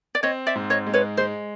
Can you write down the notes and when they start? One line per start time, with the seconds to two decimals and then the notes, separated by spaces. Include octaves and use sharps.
0.15 D5
0.23 C4 C#5 D#5
0.47 D5 E5
0.55 G#2
0.70 C#5 D#5
0.87 G#3
0.94 B4 C#5
1.17 G#3 C5